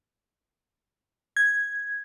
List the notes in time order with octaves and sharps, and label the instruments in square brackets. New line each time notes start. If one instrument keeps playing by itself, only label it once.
[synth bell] G#6